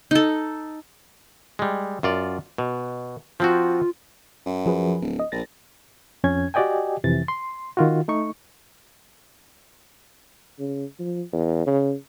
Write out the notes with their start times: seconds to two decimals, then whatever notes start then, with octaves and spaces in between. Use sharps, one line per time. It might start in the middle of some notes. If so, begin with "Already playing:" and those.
0.11 D#4 A4
1.59 G3 G#3
2.03 F#2 F4 D5
2.58 B2
3.40 F3 C4 F4 F#4
4.46 F#2
4.66 F3 G#4 B4
5.02 D1
5.19 D#5
5.32 A#1 A6 A#6
6.24 F2 C#4 G#6
6.54 F#4 G4 D5 D#5 G5 G#5
7.04 F2 C3 E3 A6
7.28 C6
7.77 D#3 F4 F#4
8.08 A3 D#4 C#6
10.59 C#3
10.99 F3
11.32 E2
11.66 C#3